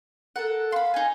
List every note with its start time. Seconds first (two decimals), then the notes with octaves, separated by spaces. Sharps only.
0.36 A4 A#4 F#5
0.72 F5 B5 C6
0.94 D#4 G#5